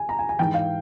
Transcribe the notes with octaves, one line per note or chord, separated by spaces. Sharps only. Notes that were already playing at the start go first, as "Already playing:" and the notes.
Already playing: G#5
A#5
G#5
G#5
G#2 E3 G5
F5